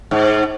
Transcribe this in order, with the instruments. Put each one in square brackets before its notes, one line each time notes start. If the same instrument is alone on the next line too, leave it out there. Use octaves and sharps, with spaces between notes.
[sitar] G#2